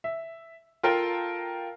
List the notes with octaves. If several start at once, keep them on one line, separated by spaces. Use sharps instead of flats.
E5
F4 A4 A#4 F5 G5 A5